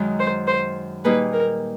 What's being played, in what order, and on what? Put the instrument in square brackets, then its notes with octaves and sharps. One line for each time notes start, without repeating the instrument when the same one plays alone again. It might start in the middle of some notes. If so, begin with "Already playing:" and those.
Already playing: [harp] F#2 D#3 G#3
[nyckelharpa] C5
C5
[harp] A#2 G3 A#3 D#4 G#4 [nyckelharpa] B4
[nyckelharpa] A#4